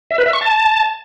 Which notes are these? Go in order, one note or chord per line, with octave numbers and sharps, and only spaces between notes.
E5
B4
E5
C#6
A5